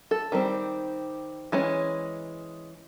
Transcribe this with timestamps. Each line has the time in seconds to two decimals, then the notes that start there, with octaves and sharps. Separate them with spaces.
0.11 A4
0.32 D#3 G3 C4
1.52 E3 G#3 C#4